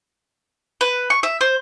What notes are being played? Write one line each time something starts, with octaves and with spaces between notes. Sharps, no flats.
B4
C#6
E5
C5